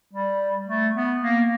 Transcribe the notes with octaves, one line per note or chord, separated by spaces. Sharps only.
G3
A3
B3
A#3